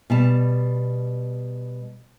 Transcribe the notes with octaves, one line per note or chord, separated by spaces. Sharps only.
B2 G3 A5